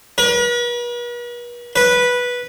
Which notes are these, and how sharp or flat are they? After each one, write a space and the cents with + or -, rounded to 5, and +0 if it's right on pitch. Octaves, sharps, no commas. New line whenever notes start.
B4 -45
B4 -10